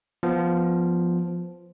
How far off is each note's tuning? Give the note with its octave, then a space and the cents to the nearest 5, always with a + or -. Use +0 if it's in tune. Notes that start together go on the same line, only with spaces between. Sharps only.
F3 +0 B3 +0